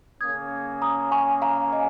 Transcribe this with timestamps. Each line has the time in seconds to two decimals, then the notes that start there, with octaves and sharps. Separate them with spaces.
0.20 C#3 A#3 C#4 D#6 G#6
0.82 A#5 D#6
1.12 G#5 C#6
1.42 F5 A#5
1.73 D#5 G#5